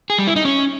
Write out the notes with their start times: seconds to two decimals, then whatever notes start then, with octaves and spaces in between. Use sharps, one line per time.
0.10 G#4
0.18 G3
0.27 E4
0.36 D#4
0.45 C#4